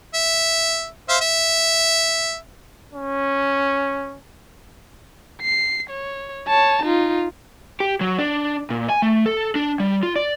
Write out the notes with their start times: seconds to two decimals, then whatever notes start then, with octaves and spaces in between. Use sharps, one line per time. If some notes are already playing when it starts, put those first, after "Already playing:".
0.14 E5
1.09 C5 E5 F5
1.21 E5
2.94 C#4
5.42 C7
5.90 C#5
6.48 C#5 A5
6.84 D#4 F4
7.80 G4
8.01 F#3
8.19 D4
8.70 A#2
8.90 G#5
9.02 A3
9.26 A4
9.55 D4
9.80 G3
10.03 F4
10.16 D5